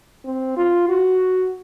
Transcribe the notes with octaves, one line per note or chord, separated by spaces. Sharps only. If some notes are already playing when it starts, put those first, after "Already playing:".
C4
F4
F#4